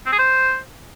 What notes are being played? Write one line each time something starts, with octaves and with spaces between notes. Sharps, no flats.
C4
G#4
C5